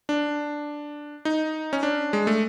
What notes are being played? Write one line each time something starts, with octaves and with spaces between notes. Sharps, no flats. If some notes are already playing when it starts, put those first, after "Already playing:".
D4
D#4
C#4
D4
G#3
A3